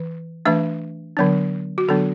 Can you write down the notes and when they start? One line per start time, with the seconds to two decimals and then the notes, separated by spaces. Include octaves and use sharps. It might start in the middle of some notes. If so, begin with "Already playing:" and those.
Already playing: E3
0.45 E3 A3 D4 E5
1.17 D3 F#3 B3 D4
1.78 F#4
1.89 D3 F#3 B3 D4 A4